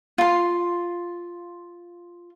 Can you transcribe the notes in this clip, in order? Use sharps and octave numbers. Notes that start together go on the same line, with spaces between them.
F4 C6